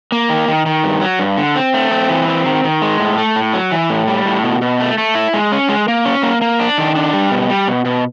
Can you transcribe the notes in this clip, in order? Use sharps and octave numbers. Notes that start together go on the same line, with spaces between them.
A#3
D#3
D#3
D#3
G2
F#3
G2
D3
C4
A3
C4
E3
C4
D#3
D#3
G#3
A2
A3
A2
F#3
E3
A2
G3
A2
B2
B2
A3
A3
E4
G#3
C#4
G#3
A#3
C#4
A#3
A#3
D4
D#3
D4
G3
B2
G3
B2
B2